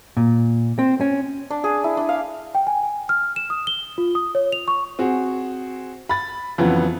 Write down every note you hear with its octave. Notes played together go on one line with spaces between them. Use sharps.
A#2
C4
C#4
D4
G#4
E4
D4
F5
G5
G#5
G#5
F6
E7
D#6
G7
F4
D#6
C#5
F7
C#6
C4 F#4 G#4
B5 A6
F2 C#3 E3 F#3 B3